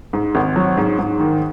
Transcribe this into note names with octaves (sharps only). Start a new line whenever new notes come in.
G#2
G#1
F#3
G#2
G#2
D#3